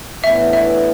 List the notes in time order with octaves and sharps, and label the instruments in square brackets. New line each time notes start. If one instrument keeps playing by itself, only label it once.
[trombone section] A2 E3 B3 D4 [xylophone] E5
[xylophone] E5